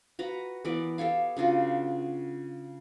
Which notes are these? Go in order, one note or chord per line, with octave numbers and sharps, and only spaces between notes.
F#4 B4 A#5
E3 B3 A#4 D5
G4 A4 C#5 F5
C#3 D4 F4 F#4